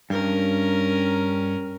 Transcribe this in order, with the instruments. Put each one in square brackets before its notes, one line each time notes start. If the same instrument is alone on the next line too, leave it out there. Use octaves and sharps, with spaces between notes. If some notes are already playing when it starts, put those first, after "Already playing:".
[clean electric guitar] G2 [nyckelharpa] C#4 A#4